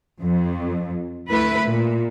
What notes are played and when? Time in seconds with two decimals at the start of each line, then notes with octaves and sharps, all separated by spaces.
0.22 F2
1.28 D2 A3 E4 B4
1.63 A#2